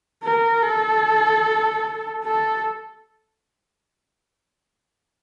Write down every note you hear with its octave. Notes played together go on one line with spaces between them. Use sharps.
A#4
A4
A4